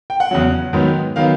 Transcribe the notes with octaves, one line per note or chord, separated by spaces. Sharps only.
G5
F#5
E2 C#3 F#3
G#2 D#3 F#3 B3
D#3 F#3 B3 F5